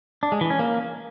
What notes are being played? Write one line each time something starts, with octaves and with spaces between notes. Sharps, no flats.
D4
G#3
E3
C#4
A#3